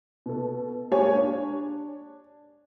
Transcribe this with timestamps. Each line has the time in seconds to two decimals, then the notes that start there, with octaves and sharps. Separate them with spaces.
0.26 B2 A4
0.91 G#3 A#3 G4 A#4 C#5 G#5
1.15 D4